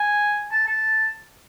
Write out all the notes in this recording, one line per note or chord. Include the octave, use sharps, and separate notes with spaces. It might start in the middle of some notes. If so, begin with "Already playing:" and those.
Already playing: G#5
A5
A5